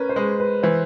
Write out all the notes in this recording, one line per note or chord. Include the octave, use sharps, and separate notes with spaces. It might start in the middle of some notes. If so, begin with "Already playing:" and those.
Already playing: C#4 A#4 B4
C5
G#3 B4
B4
E3 C5